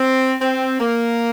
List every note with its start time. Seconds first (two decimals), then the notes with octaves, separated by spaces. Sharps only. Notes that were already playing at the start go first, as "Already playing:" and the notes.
Already playing: C4
0.42 C4
0.80 A#3